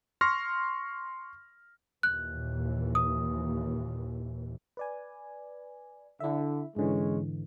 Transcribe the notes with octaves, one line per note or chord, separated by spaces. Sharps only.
C6 C#6 F6 A#6
D#2 A#2 E3 F#6
D#6
B4 D5 G#5
D3 E4 E5
G#2 D3 E3 G#3 C#4